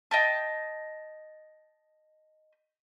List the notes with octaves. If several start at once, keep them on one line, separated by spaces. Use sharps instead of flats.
D#5 G5 A5